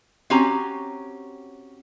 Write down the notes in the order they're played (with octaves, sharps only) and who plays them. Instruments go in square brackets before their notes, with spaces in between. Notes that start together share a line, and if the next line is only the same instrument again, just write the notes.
[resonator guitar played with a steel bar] C4 C#4 F#4 G4 G#5 A#5